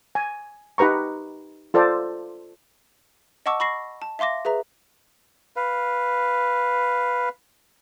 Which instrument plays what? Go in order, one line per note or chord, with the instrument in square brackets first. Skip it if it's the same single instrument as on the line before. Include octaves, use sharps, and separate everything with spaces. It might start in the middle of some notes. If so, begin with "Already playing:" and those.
[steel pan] G#5
D#4 G4 B4 A#5 C#6
F4 A4 C5 D5
[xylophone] D#5 F#5 A5 C#6 D6 E6
B5 C#6 A#6 C7
A5
E5 F5 C6 D6 A#6
G#4 B4 E5 A#5
[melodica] B4 F5